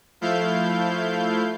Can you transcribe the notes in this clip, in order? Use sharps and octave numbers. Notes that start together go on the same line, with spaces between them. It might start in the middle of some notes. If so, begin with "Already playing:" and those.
F3 A3 E4 F5 G6